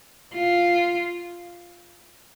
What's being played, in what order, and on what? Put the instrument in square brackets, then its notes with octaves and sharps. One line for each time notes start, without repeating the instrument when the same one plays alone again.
[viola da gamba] F4